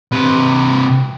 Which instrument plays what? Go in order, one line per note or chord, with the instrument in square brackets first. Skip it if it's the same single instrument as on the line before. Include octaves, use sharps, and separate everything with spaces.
[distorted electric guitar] C3 B4